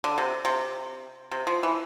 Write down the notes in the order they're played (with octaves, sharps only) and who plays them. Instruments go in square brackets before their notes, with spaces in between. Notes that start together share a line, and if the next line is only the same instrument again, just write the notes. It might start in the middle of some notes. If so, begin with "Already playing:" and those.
[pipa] D3
C3
C3
C3
F3
E3